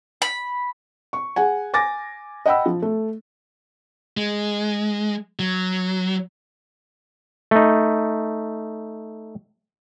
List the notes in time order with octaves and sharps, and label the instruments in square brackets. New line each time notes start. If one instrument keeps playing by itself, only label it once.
[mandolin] B5
[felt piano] C#6
G#4 F#5 G#5
G#5 D6 A6 A#6
D#5 F#5 G5 B5 E6
F3
A3
[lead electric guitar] G#3
F#3
[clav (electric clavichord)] A3 D#4